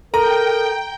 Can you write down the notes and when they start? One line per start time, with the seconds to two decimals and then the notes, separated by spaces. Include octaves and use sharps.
0.14 A4 A#4 G5 A#5